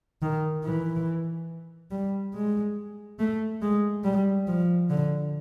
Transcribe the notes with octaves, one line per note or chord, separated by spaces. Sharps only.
D#3
E3
G3
G#3
A3
G#3
G3
F3
D3